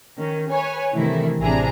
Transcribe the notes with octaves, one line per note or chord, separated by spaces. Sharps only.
D#3 C#4
B4 C#5 G#5
G2 C3 D#3 E3 A3 E4
A1 C3 D4 E4 G#4 A#5